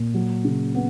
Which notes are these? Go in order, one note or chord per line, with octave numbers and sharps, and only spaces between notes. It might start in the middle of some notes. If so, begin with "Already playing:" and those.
Already playing: A#2
F#3
C#3
B3